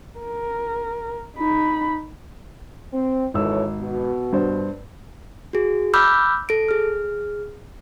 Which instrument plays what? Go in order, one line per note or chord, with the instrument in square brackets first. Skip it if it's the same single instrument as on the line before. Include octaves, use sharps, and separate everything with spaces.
[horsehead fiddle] A#4
D#4 B5
[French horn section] C4
[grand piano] G#1 E6 [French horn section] E3 A4 C#5
[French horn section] B2
[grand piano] G2 C5
[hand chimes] F#4 G#4
B5 D6 E6 F6 G6
A4 D7
G#4 F6